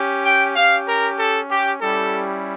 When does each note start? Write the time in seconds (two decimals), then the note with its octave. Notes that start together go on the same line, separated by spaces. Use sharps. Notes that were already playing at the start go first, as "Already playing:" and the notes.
Already playing: C#4 G4
0.24 G5
0.56 C#4 G4 F5
0.88 A#4
1.19 A4
1.51 G4
1.82 G3 C#4 E4 G4 A4